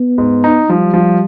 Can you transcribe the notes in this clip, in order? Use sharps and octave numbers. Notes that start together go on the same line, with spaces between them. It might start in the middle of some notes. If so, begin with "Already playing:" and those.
Already playing: B3
G#2
D#4
F3 G3
F3